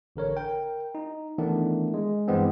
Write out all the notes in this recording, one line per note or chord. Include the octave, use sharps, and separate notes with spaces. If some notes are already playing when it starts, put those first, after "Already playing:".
A1 D3 A#4 C#5
A#4 G5
D#4
D#3 E3 A3 B3 D4
G#3
G2 E3 G#3 B3 C4